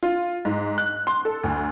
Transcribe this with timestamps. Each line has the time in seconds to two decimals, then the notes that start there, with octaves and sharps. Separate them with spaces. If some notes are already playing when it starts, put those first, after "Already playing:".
0.03 F4
0.45 G#2
0.78 F#6
1.07 C6
1.25 A4
1.44 D2